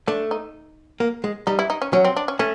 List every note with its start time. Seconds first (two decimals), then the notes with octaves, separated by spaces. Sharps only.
0.07 A3 D4
0.31 D#4
1.00 A#3
1.24 G#3
1.47 G3 D#4
1.59 E4
1.70 D#4
1.82 C#4
1.93 F#3 C#4
2.04 C4
2.16 D4
2.28 C#4
2.39 A3 C#4